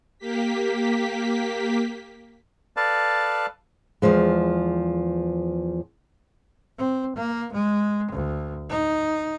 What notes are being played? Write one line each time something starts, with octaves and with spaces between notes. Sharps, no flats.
A#3 G4 B6
A4 B4 D5 F5 A5
E2 G#2 F3 G#3
C4
A#3
G#3
D2
D#4